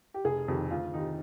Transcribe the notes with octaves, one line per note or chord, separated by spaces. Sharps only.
G4
F1 G#4
F2 C3 D#3
D2 F4
C3 D#3 D#4